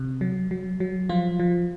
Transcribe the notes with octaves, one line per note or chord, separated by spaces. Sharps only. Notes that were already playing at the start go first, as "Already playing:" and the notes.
Already playing: C3
F#3
F#3
F#3
F3 F4
F3